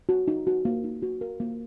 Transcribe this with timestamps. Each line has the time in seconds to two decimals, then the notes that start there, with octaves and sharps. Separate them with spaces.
0.09 F#4
0.28 D#4
0.47 F#4
0.65 A#3
0.84 D#4
1.02 F#4
1.21 A#4
1.40 A#3